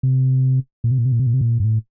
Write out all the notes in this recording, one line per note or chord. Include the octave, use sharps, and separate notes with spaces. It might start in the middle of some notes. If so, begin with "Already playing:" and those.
C3
A#2
C3
A#2
C3
A#2
C3
A#2
C3
A#2
G2
A2